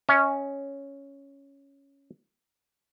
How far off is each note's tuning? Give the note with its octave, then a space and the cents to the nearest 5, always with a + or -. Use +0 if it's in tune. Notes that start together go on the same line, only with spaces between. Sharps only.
C#4 +0 D#5 +40